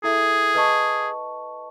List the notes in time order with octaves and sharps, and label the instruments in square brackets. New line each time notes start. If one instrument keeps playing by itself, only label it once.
[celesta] E4 A4 E5 [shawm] G#4
[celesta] B4 D#5 A5 C#6